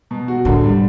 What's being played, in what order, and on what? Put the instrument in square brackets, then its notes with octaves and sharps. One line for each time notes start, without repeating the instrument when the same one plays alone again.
[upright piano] B2
F#4
[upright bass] A2 [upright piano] D3
[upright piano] G3